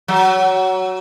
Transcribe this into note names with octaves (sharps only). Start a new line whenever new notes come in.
F#3